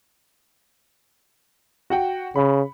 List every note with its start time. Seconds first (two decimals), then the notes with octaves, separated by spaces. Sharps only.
1.90 F#4 F#5 G5
2.36 C#3 B5